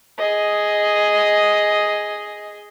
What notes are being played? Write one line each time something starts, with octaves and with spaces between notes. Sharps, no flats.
G#4 D#5